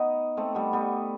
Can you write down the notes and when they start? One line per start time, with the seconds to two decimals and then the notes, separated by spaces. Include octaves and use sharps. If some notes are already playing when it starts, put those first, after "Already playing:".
Already playing: B3 D#4
0.37 A3 C4
0.55 G3 B3
0.73 G3 B3